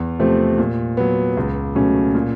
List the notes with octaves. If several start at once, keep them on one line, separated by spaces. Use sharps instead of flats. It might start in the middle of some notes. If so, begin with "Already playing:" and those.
Already playing: E2
C3 F3 A3 C4
A#2
F#3 B3
C#2
B2 F#3 A3 C#4
A#2